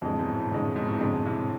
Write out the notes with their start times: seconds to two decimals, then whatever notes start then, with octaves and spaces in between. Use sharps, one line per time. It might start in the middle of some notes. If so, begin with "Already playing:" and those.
0.01 F2 A2 D3 G#3
0.19 G#2 B2
0.34 A2
0.52 F2 D3 G#3
0.64 A2
0.76 G#2 B2
0.88 A2 C3
1.00 F2 D3 G#3
1.25 A2 C3